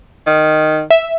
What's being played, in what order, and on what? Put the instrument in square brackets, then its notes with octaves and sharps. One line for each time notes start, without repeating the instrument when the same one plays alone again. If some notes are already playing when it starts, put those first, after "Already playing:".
[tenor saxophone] D#3
[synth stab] E5